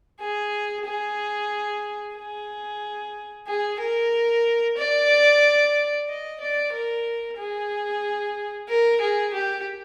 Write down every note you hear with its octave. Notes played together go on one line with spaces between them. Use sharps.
G#4
G#4
G#4
G#4
A#4
D5
D#5
D5
A#4
G#4
A#4
G#4
G4